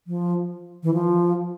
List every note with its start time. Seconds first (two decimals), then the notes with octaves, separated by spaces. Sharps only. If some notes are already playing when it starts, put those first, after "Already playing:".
0.07 F3
0.83 E3
0.94 F3